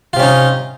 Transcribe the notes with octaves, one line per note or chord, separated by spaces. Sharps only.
C3 C#4 D#4 F4